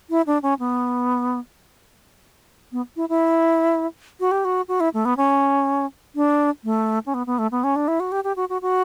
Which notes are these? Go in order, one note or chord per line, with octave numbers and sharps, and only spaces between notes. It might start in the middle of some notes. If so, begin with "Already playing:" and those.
E4
D4
C#4
B3
B3
E4
E4
F#4
G4
F#4
F#4
E4
A3
B3
C#4
D4
A3
C#4
B3
B3
A3
B3
C#4
D4
E4
F#4
G4
G4
F#4
F#4
F#4